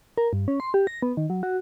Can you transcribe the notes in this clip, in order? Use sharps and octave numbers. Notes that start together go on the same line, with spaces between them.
A#4
G2
C#4
C6
G4
A#6
B3
D#3
F#3
F#4